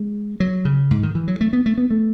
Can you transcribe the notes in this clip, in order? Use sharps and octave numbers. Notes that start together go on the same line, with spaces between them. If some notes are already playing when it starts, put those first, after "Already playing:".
Already playing: G#3
F#3
C#3
G#2
D#3
E3
F#3
A3
B3
A3
B3
A3